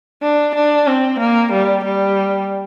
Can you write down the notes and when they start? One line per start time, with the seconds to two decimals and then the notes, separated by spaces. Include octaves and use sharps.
0.23 D4
0.55 D4
0.88 C4
1.20 A#3
1.53 G3
1.85 G3